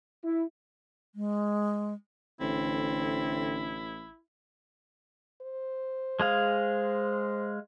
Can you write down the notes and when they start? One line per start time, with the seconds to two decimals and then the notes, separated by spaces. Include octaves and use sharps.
0.24 E4
1.15 G#3
2.40 A1 D3 C4 E4
5.42 C5
6.20 G#3 G#4 F5